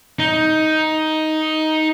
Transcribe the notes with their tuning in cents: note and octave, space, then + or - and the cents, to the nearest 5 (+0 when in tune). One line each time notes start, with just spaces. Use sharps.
D#4 +10